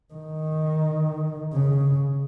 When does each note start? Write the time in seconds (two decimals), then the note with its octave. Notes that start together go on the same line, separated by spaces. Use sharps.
0.14 D#3
1.54 C#3